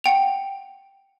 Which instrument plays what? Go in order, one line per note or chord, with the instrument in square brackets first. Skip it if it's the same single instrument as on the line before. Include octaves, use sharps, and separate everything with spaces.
[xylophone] F#5 G5 F7